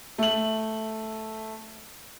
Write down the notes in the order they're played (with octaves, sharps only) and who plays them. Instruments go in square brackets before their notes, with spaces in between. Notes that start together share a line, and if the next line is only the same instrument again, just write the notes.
[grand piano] A3 F#7